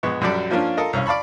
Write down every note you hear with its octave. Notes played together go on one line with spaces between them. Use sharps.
A#1 G#3 B3 C#6
A#1 F#2 F#3 G3 A4 D5
F3 A#3 C#4 D4 F4
F4 A4 A#4 D#5
C2 C#4 F5
D5 F5 A5 B5 C#6